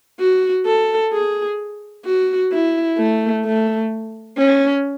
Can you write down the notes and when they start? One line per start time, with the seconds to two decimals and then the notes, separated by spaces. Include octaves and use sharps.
0.20 F#4
0.66 A4
1.13 G#4
2.05 F#4
2.52 E4
2.98 A3
3.45 A3
4.38 C#4